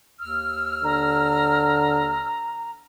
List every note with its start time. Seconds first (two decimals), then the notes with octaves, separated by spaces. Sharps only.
0.21 D#2 E6 F6
0.84 D3 A#5